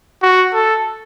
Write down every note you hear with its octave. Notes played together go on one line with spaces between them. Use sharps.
F#4
A4